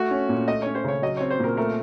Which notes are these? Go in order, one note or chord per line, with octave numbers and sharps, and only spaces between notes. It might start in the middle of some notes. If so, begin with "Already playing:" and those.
Already playing: A3 F#4
C#4
A#2
A3 D#5
C#4 C#5
C5
C#3 C#5
F#3 D#5
C4 C#5
C5
A#2 A#4
A3 A#4